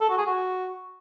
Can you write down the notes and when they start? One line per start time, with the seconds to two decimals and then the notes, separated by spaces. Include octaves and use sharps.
0.01 A4
0.09 F#4
0.18 G#4
0.27 F#4